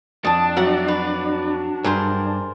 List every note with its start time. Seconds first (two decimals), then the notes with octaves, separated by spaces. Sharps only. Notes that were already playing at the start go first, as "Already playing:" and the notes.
0.25 F2 D4 A5 D#6
0.56 F#3 E5 F#5 A#5
0.88 B4
1.84 G2 G#4 A#4 C5